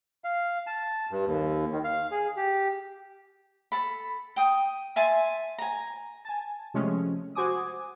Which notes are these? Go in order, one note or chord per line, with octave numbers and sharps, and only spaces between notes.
F5
A5
G2
D#2
D#3
F5
G#4
G4
A4 B5
G5 D#6
E5 G#5 A5 C6
G#5 A#5
G#5 A5
C3 F3 G#3 A3 C#4
F#4 C5 G#5 D6 D#6